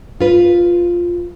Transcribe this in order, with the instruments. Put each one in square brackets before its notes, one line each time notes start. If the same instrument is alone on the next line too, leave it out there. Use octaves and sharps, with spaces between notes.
[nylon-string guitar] F4 B4